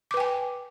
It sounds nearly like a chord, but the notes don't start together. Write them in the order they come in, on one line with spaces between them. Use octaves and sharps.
D6 B4 G5 G#5